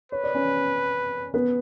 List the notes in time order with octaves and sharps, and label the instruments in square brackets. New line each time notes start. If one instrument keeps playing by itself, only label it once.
[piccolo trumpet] B4 [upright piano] C#5
[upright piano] D5
C#4 C#5
B3 B4